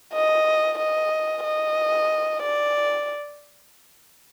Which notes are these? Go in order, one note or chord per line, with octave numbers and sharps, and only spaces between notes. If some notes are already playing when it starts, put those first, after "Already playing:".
D#5
D#5
D#5
D5